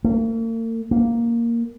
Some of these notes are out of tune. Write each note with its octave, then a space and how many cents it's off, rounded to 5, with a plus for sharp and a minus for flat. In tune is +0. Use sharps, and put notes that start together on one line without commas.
A#3 -45
A#3 +0